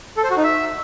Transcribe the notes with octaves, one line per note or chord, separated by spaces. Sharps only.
A4
C5
F#4
D#4
E5